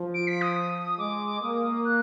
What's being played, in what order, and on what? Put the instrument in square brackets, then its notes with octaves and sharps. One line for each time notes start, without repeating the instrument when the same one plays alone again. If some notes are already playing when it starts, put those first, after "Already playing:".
Already playing: [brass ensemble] F3
[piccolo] D7
B6
D#6
D#6
[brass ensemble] G#3 [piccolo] D6
[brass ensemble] A#3 [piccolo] D#6
[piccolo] F#6